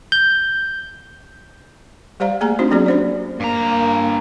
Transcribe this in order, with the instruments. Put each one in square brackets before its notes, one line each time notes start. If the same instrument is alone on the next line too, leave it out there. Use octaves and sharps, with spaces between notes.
[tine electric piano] G6
[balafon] G3 G4 C5 D5 F5 A#5
A3 A#3 G#4 G#5 A#5
C4 D4 D#4 F#4 C5
F#3 A#3 C#4 G4 G#4 D5
D4 C5 D5
[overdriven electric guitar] G2 A#5 [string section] A#3